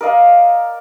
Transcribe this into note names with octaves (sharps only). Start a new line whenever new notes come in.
A#4 D5 D#5 F5